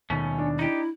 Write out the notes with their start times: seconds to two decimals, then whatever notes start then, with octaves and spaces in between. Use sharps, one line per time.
0.10 D#2 B2 D#3 A3 C#4
0.38 D4
0.59 D#4 E4 G4